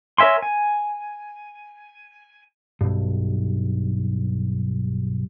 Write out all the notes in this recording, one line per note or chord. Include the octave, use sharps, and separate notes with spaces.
A#4 C#5 E5 G#5 C6
G#5
B1 G2